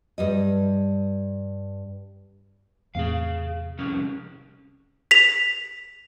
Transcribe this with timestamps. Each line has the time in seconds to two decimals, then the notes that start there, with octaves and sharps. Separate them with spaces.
0.18 G2 G3 D#5
2.95 E2 A2 C3 G#4 F5
3.78 C2 F2 C#4
5.11 B6 F7